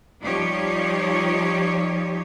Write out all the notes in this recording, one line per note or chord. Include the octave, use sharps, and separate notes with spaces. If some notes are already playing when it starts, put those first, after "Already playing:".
F3 G3 D#4 F4 G4 C#5